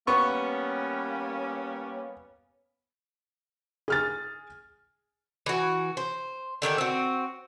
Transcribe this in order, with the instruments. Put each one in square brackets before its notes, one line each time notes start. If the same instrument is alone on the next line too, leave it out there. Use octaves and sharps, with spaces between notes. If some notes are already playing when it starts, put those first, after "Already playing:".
[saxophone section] G3 A#3 C#4 [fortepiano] B3 C#6
[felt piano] G#4 F6 A6
[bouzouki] E3 F#4
C5
D3 D#3 D4 G4
C4 F#4